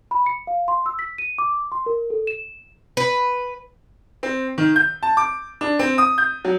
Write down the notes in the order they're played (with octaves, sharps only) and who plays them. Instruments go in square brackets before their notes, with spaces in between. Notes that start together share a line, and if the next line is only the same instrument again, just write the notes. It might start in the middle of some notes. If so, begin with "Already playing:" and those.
[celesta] B5
C#7
F5
C6
E6
B6
D#7
D6
C6
A#4
A4
E7
[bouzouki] B4
[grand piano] C4
D#3
G6
A5
D6
D4
C4
D#6
G6
F#3